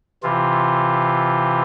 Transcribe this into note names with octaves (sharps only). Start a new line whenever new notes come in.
C3 E3 F4